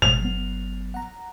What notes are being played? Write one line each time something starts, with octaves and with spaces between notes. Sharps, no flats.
G1 B2 G#3 F7
F#3 B3
F#5 A#5